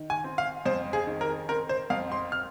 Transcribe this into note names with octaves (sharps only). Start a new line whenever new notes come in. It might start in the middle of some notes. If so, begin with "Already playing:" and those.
Already playing: D#3
G#5
C4
F5
F2 C5
G#4
D#3
A#4
C4 A#4
C5
F2 F5
C6
F6